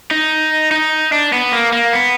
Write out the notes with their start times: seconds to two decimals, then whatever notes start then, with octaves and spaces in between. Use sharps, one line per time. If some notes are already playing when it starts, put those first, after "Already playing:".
0.11 D#4
0.71 D#4
1.12 D4
1.33 B3
1.53 A#3
1.73 A#3
1.93 B3